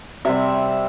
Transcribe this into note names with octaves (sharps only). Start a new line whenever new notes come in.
C3 G3 C4 E5